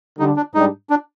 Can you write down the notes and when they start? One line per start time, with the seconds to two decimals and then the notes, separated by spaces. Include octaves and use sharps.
0.19 D3 G3 D4 D#4
0.36 D4
0.54 G#2 G3 D4 D#4
0.90 D4